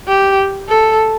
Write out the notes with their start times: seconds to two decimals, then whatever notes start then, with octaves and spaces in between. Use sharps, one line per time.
0.08 G4
0.69 A4